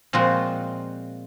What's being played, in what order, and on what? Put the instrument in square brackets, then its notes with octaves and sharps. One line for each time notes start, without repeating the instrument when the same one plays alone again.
[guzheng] A#2 F3 G#3 C4 F4 F#4